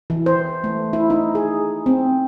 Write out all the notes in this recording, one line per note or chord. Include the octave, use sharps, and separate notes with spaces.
E3
C5
A3
E4
D#4
G#4
C4